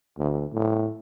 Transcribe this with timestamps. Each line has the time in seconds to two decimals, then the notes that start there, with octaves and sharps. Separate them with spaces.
0.18 D2
0.53 A2